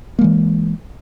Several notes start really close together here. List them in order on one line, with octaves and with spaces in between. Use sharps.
A#3 G#3 E3